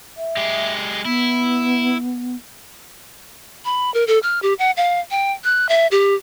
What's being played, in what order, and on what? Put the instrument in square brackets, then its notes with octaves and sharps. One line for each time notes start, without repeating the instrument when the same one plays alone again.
[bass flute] E5
[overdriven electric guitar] G#3 G4
[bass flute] B3 [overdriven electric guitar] E4
[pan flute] B5
A#4
A4
F6
G4
F#5
F5
G5
F#6
E5
G4